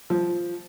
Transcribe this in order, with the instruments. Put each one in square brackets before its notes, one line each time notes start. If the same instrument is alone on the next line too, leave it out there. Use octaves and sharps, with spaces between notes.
[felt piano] F3